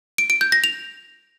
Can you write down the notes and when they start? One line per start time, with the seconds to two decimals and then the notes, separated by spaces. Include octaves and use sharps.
0.18 D7
0.30 D7
0.41 G6
0.52 A#6
0.64 F7